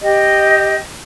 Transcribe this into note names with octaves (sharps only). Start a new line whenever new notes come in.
G4 D#5